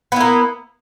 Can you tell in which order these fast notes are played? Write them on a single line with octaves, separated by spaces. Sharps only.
B3 E4 A#3